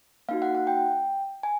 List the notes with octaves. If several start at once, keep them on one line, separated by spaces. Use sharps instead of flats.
A#3 D#4 F#4 F5
F#5
F#5
G5
G#5